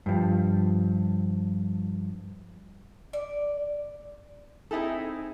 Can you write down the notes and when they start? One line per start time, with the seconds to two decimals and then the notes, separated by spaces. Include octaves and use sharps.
0.06 G2 F3
3.13 D5
4.71 C4 D#4 E4 G#4 A4